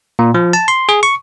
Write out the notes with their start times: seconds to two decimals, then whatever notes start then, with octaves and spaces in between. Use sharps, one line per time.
0.19 A#2
0.34 F3
0.53 A5
0.68 C6
0.89 G#4
1.03 C#6